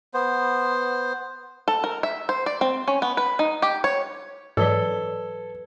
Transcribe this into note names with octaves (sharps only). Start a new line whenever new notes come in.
B3 C5
A4
A#4
E5
C5
D5
C4
C#4
B3
B4
D#4
G4
C#5
G#2 E3 F#3 A4 B4 D5 G#6 G7